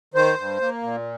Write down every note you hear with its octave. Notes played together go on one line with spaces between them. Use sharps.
D#3 C5
G2
A#3
A#2